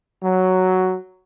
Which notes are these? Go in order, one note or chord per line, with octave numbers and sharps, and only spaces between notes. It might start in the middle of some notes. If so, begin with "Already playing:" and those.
F#3